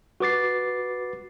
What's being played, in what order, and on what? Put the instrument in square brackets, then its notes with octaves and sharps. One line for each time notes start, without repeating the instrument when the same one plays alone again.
[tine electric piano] F#4 B4 D6 A6 C7